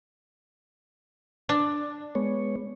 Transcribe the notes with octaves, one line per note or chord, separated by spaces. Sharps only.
D4
G#3 B3 C#5